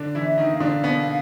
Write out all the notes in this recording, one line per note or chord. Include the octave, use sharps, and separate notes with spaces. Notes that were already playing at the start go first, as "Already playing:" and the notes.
Already playing: D3 D4
E3 E4
E5
D#3 D#4
F5
D3 D4
B2 B3